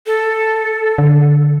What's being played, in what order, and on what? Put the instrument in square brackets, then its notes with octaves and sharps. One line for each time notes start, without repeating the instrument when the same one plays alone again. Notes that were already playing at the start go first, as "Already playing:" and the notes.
[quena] A4
[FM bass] D3